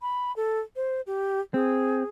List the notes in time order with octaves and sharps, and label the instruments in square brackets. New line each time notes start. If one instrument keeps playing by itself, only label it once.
[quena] B5
A4
C5
G4
[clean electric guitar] C4 [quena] G#4